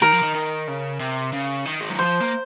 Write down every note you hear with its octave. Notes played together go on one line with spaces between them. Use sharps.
D#3 A#4
F3
D#3
D#3
C#3
C3
C#3
D#3
G#3
F#3
F3 C5
A#3